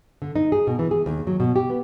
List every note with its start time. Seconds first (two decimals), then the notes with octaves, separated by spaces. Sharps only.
0.22 D3
0.36 D#4
0.52 G#4
0.67 B2
0.79 E3
0.91 G#4
1.06 D#2
1.27 F#3
1.40 B2
1.56 G4
1.70 B3